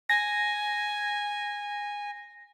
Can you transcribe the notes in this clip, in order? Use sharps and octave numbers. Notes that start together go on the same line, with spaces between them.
G#5 A#6